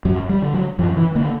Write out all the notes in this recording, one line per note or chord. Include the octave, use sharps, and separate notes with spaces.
F#2 F#3
G3
D3
F#3
F#2 F3
E3
D3 A#3